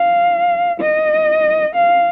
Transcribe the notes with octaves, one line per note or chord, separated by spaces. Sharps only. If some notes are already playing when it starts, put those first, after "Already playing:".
Already playing: F5
D#5
F5